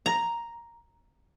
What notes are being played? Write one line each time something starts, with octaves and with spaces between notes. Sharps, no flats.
A#5